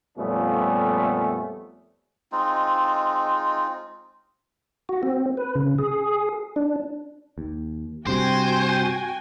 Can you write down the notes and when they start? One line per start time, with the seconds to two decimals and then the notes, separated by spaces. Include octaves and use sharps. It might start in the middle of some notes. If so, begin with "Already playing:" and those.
0.18 F2 A#2 G3 A3 B3 C#4
2.32 G#3 C4 D#4 F4
4.89 F#4
5.03 C4
5.37 B4
5.55 C#3
5.78 G#4
6.56 D4
7.38 D#2
8.07 G2 C3 F#4 C5 G5 G#5